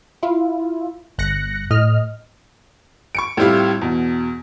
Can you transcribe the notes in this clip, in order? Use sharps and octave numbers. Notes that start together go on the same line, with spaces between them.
E4 F4
G1 F#6 A#6 C#7
A2 D#5 F6
C#6 C#7 D7
A2 G3 C4 E4 F4 G4
E2 B2